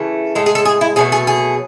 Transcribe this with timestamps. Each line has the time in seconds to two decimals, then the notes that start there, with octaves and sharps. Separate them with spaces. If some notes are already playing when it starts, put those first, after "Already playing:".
Already playing: C#3 E3 A3
0.35 A2 G#3 A4
0.46 G#4
0.55 A4
0.65 G#4
0.81 E4
0.96 B2 F#3 A3 G#4
1.12 G#4
1.27 G#4